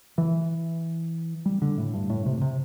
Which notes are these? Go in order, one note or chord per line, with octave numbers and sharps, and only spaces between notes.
E3
G3
D3
A2
G2
A2
C3
C3